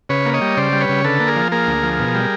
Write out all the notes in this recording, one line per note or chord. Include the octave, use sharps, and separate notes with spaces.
C#3 B4 C#5
A#3
C#5 D#5
G3
C#3 C5 D5
G3
B4 C#5
C#3
D3 A4 B4
A#3
G#4 A#4
F3
A#3 G#4 A#4
D2
F3
B2
G3